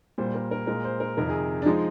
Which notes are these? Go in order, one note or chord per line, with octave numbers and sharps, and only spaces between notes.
A#2 G3 C5
A#4
A#4
A#2 G#3 A#4
C5
A#4
F2 C3 D#3 A#4
G#4
D4
F3 G#3 D#4